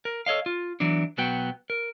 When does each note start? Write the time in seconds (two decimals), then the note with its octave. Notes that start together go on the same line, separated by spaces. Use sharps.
0.05 A#4
0.26 A4 C#5 D#5 F5
0.46 F4
0.80 E3 F#3 B3 D4
1.17 B1 F#3 B3 F#4 G5
1.70 A#4